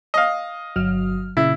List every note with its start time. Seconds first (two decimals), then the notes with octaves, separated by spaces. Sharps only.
0.14 D#5 F5
0.76 G1 F#3 F6
1.37 A#2 C#3 E4